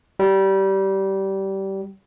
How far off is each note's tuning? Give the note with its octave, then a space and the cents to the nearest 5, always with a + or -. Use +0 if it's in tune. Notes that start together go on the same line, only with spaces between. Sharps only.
G3 -20